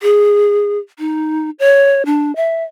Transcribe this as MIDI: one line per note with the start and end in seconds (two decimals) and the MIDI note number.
0.02 0.79 68
0.99 1.50 63
1.59 2.05 73
2.05 2.35 62
2.36 2.64 76